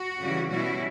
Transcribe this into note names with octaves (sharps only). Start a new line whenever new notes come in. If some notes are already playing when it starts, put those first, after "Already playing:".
Already playing: F#4
C#3 E3 G3
B2 G3 C#4 E4 F#4